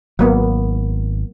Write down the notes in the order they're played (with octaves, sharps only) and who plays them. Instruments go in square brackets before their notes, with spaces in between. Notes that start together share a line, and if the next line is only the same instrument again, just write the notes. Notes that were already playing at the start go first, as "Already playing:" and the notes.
[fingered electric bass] G#1 [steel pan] F#3 A#3 B3